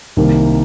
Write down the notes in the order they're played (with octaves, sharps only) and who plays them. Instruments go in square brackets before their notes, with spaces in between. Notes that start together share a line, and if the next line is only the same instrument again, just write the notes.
[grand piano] C2 C3 D#3 A#3